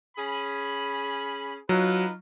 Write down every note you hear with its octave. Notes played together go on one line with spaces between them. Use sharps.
C#4 G#4 B5
F#3 D#4 F4 B4